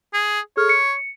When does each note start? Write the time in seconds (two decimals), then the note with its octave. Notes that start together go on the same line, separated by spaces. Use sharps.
0.13 G#4
0.57 G#4 A4 C#5 F6
0.69 C#7